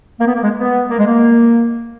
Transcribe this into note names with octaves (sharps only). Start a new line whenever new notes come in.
A#3
B3
A#3
G#3
B3
A#3
G#3
A#3